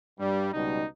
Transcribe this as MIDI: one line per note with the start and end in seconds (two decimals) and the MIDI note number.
0.20 0.50 43
0.20 0.50 55
0.53 0.86 37
0.53 0.86 47
0.53 0.86 55
0.53 0.86 63